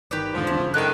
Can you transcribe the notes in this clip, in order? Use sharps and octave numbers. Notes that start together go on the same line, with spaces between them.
G1 D#3 G4 B4 D5
E1 G#2 D3 F3
G1 E2 D4 E4
F#1 C#3
A2 D3 D#3 G5 F#6